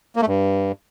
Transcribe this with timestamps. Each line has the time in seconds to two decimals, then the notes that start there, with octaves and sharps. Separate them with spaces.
0.16 A#3
0.22 A3
0.27 G2